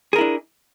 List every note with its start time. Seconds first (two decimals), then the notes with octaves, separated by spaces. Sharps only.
0.13 G#4
0.16 A#4
0.18 E4
0.21 D4